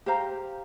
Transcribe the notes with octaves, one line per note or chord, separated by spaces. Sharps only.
G4 C5 F5 A#5